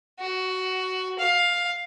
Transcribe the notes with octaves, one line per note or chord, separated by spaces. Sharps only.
F#4
F5